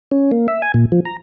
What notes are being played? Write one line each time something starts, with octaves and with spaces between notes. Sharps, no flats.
C#4
A#3
E5
G#5
A#2
F3
A#5